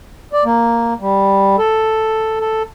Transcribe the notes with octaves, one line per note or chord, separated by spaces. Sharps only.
D5
A#3
G3
A4
A4